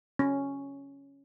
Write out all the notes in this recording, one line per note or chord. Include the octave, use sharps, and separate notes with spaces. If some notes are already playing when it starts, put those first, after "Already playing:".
C#4